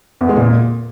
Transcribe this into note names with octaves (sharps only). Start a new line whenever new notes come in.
E2
G#3
A#2